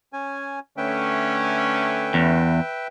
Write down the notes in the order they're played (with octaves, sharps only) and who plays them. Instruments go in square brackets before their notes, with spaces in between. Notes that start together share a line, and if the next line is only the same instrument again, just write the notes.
[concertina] C#4 G#5
[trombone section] D3 A3 C#4 [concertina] B4 E5 G5
[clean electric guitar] E2